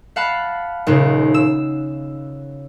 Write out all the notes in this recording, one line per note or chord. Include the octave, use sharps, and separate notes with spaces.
F5 F#5 A5 B5
D#1 D#2 C#3
E6